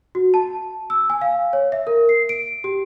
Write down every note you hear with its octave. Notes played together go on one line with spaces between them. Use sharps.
F#4
A5
E6
G#5
F5
C#5
E5
A#4
C7
D7
G4